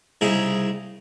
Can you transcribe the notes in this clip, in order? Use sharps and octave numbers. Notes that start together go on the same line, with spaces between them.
C2 C#3 D#4 E4 G#4